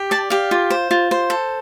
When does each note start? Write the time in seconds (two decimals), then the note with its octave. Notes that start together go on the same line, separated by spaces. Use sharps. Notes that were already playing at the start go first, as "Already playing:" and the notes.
Already playing: G4
0.11 D5 A5
0.30 G4 F5
0.51 F4
0.70 C5
0.91 F4
1.11 C5
1.30 A4